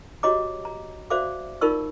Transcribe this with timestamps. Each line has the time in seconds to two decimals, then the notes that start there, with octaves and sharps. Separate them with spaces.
0.23 F#4 G4 C#5 D#5 A#5 D6
0.65 A#5
1.10 F#4 C5 D5 E5 F5 D6
1.61 D#4 F4 A#4 D5 C#6 E6